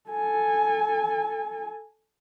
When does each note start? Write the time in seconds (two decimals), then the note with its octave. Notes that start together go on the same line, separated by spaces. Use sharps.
0.10 A4 G#5